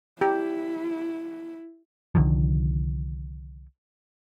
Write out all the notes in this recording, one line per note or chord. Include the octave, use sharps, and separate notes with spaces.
E4 G4
C2 D3 D#3 F3